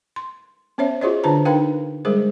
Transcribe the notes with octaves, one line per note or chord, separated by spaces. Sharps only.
C6
B3 C#4 C5 C#5 E5
F4 F#4 G#4 C5 C#5 D#5
D3 D4 F4 C5 A5 A#5
D4 D#4 A#4 B4 F5 G5
G3 G#3 G#4 A#4 C5